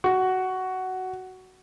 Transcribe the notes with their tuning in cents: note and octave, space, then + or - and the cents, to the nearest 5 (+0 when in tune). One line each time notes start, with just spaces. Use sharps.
F#4 +10